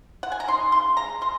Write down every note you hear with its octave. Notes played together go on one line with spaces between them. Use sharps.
F#5
G#5
A#5
D#4 C6
C#3 C6
G#3 A#5
G#3 C6